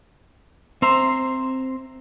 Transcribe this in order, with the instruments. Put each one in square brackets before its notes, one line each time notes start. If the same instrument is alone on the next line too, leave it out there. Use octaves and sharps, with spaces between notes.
[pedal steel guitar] C4 A#5 C6 [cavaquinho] C5 E5